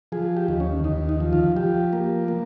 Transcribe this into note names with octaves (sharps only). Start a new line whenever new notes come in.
F3 G#4
G4
D#2
C#4
D#2 D#4
D#4
F3
F4
F3 G4
A#3
A#3